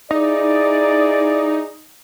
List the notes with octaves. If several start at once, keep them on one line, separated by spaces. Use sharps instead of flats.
D#4 E4 G#4 D5